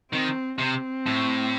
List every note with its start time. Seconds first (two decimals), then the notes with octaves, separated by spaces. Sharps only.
0.12 D#3 C4
0.59 C3 C4
1.07 A2